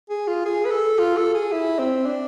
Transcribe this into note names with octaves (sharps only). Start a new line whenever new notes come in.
G#4
F4
G#4
B4
A4
F4
A4
G#4
E4
C4
D4